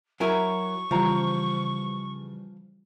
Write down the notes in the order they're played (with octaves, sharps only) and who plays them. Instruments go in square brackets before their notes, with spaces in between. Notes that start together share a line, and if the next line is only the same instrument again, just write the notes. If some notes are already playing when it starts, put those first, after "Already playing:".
[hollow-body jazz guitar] F#3 E4 A#4 [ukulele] G#5 A#5 [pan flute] C#6
[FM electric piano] C#3 E3 G3 [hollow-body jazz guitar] F3 [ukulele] C5 A#5